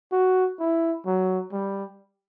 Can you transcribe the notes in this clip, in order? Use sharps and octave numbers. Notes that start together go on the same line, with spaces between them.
F#4
E4
F#3
G3